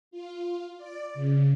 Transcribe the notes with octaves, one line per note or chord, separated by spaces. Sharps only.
F4
D5
C#3